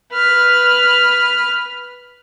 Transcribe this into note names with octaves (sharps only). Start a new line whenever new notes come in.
B4 F6